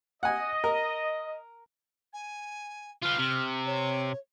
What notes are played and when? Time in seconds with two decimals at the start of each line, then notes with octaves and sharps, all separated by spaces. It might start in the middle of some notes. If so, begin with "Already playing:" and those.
0.23 D#5 F#5 G#5
0.64 A#4
2.13 G#5
3.03 F4 B4 F6
3.19 C3
3.66 C#5